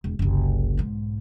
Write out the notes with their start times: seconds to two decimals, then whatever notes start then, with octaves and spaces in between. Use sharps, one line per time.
0.04 E1
0.19 F#1 C2
0.77 B1 G#2